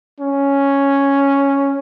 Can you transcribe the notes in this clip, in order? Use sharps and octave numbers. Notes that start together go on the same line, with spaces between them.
C#4